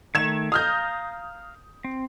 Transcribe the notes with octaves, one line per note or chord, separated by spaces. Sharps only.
D#3 A3 G#6 E7
F5 A#5 D#6 F6 G6
C4